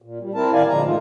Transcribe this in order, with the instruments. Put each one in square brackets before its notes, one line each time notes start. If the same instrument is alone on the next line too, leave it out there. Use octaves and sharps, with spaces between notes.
[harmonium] A#2
G3
C4 E4 A#4 A5
A2 D#3 D5 F5 G#5
A#2 D3 F3 G#3 A#5
G#2 D#3 E3 A3 D#4 F4